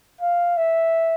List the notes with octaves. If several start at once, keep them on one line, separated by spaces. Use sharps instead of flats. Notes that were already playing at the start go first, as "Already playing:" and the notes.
F5
E5